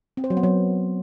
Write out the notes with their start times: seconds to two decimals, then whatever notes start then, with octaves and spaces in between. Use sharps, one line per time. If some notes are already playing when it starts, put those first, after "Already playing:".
0.17 C4
0.24 C5
0.30 F#3
0.37 B3
0.43 F#3